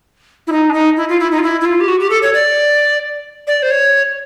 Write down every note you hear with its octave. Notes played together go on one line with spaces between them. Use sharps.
E4
D#4
D4
D#4
E4
F4
E4
D#4
F4
E4
E4
F4
G4
F#4
G4
A4
C#5
D5
D5
C5
C#5